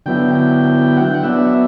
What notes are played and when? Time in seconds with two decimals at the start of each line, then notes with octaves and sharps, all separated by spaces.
0.06 D3 F#3 B3 E4 G5
0.35 G5
0.97 F#5
1.04 G5
1.14 F#5
1.23 F#3 B3 D4 E5